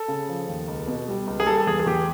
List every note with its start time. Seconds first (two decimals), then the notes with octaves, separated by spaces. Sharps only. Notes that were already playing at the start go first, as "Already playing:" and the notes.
Already playing: A4
0.08 C#3
0.29 F3
0.48 D#2
0.68 C#2
0.87 B2
1.08 G3
1.27 C#2
1.40 G#4
1.47 G3 A4
1.57 A4
1.67 E2 G#4
1.80 G#4
1.86 E2 G4